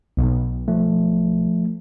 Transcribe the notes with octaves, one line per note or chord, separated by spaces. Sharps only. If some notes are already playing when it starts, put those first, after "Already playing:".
B1
F3 A3